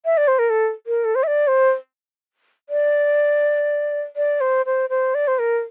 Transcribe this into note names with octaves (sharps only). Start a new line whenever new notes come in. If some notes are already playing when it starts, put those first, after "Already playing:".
E5
D5
C5
A#4
A4
A#4
A4
C5
E5
D5
C5
D5
D5
C5
C5
C5
D5
C5
A#4